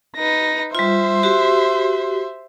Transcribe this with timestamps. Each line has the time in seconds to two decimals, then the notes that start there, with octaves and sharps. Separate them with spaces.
0.17 D#4 B4 A#6
0.75 G3 F4 C5 E5 C6
1.23 F#4 G4